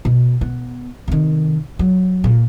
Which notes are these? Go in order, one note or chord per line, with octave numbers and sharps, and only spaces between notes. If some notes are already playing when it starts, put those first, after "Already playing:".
B2
B3
C3 D#3
F#3
A#2